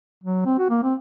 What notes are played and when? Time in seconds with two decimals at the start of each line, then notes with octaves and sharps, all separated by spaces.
0.24 F#3
0.46 C4
0.59 F#4
0.70 A#3
0.83 C4